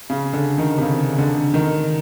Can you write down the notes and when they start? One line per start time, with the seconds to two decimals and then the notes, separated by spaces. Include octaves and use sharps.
0.10 C#3
0.33 D3
0.58 D#3
0.78 C3
0.81 C#3
1.18 D3
1.54 D#3